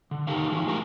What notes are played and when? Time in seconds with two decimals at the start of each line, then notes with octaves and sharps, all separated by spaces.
0.11 D3
0.27 D#3 D#4 G4 A4 A#4 F5
0.48 E3 F3 G#3 D4 D#4 G#4
0.67 A3 E4 G4 A#4 F5 G#5